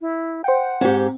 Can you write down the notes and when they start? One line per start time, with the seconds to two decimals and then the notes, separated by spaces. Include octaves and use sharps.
0.01 E4
0.44 C5 F#5 G5
0.81 G#2 C4 G4